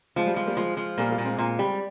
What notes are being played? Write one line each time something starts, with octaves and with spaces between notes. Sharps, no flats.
F3 G#3
G3
F3 G#3
G3 A#3
F3 G#3
F3
A#2 G3 A#3
G3 A#3
A#2
G#3 C4
A#2
G3